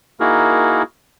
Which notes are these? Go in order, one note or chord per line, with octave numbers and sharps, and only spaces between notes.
A#3 D#4 E4 F#4 G#4 A#4